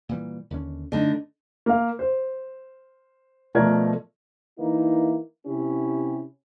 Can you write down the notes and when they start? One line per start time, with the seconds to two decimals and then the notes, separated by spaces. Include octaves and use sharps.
0.09 A#2 E3 G3
0.50 D#2 D3 C#4
0.92 D3 A3 D#4
1.66 A#3 F5
1.99 C5
3.55 B2 F3 A3 A#4 D5 G#6
4.59 E3 A#3 D#4 E4
5.47 C3 C#4 E4 G4